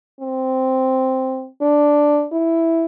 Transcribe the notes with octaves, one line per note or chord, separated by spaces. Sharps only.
C4
D4
E4